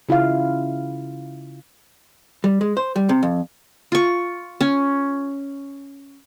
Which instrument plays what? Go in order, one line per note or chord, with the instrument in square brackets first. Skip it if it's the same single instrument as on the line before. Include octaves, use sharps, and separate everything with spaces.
[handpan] C#3 E4 F4 F5
[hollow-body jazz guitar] G3
G#3
C5
G3
C3
F2
[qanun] F4 C#6
C#4